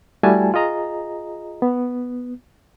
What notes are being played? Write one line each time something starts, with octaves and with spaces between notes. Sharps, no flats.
G3 A3 E4 F#4 G#5 A5
F4 G#4 D#5 A#5
B3